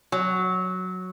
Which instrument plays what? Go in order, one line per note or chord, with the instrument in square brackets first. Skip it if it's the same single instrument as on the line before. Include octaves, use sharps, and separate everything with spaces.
[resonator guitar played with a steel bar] F#3